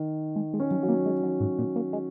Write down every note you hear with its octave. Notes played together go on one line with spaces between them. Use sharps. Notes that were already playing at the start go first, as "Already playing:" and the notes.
Already playing: D#3
G#3
G#3
C#4
F#3
F#3
A#3
G#3
F#3
G#2
A#2
A#3
G#3